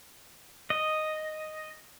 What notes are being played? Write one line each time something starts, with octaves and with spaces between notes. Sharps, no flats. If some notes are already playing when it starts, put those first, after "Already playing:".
D#5